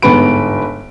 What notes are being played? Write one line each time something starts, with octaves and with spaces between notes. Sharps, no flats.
G1 G#2 B3 B4 B5 D7